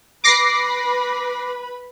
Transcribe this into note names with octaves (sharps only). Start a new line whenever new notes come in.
B4 B5 D6 A#6 C7